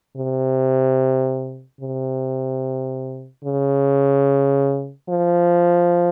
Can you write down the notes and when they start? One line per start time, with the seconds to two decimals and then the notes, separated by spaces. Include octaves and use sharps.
0.17 C3
1.81 C3
3.45 C#3
5.09 F3